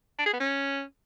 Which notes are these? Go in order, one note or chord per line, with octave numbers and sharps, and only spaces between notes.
D4
G#4
B3
C#4